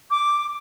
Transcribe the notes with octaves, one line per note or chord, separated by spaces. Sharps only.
D6